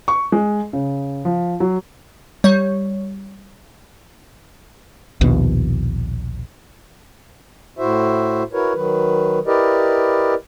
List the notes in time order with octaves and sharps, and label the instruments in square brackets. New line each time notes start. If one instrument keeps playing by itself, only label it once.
[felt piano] C#6
G#3
C#3
F3
F#3
[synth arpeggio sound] G3 C#5
[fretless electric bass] A#1 D#2 B2
[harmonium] A2 E4 F#4 C5 E5
E4 F#4 A#4 B4 C#5
D#3 F#3 B4
E4 G4 A#4 B4 D5 D#5